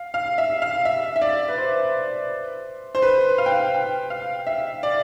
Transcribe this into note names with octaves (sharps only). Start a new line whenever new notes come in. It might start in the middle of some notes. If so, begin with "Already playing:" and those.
Already playing: F5
F5
E5
F5
E5
E5
D5
B4
C5
C5
B4
F5
G5
F5
G5
F5
E5
D5